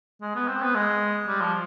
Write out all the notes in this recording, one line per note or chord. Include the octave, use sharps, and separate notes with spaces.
G#3
B3
C4
B3
G#3
G3
F3